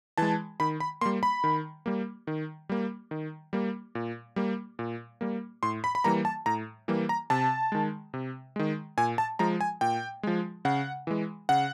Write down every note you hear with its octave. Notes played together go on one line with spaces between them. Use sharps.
E3 G#3 A5
D#3 B5
B5
G3 A#3 C6
B5
D#3
G3 A#3
D#3
G3 A#3
D#3
G3 A#3
A#2
G3 A#3
A#2
G3 A#3
A2 C6
B5
B5
E3 G3 A#3 A#5
A5
A2 A#5
E3 G3 A#3
A#5
C3 A5
D#3 G#3
C3
D#3 G#3
A#2 G#5
A5
F3 G#3 A#5
G#5
A#2 G5
F3 G#3
C#3 F#5
E3 G#3
C#3 F#5